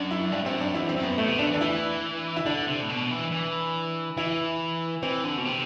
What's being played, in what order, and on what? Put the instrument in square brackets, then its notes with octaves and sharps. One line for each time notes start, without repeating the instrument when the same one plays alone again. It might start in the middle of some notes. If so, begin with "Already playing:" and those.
Already playing: [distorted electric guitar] F#2 [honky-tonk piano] D4
[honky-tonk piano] E4
[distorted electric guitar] G2 [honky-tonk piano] D4
[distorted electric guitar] G2 [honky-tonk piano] C4
[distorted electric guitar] F#2
[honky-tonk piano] D4
[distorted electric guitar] E2 [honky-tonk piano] E4
[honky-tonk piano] C4
[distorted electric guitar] F#2
[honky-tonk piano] B3
[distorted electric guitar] A2 [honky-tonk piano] A3
[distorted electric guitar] C3
[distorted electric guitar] D3 [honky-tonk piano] D4
[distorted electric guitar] E3
[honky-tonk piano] D4
[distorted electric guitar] E3 [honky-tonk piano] E4
[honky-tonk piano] E4
[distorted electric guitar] D3 [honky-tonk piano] D4
[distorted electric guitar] C3
A2
B2
E3
E3
[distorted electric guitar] E3 [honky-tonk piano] E4
[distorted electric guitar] E3 [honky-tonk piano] C4
[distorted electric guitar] D3
B2
C3